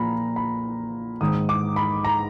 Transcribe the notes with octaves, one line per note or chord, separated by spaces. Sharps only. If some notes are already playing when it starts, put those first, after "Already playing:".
Already playing: A#2 F3 A#5 B5
B5
G#2 D#3 D#6
D6
B5
A#5